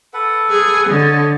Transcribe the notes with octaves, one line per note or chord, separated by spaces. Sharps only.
A4 B4 F#5
G#4
D3 C#5 D#5